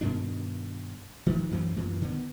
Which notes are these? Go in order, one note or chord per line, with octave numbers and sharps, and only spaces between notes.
G2 B2 D#3 D4
D#3 F3
F#2 E3 F#3 C4
F#2 A#2 E3
D3 D#3 B3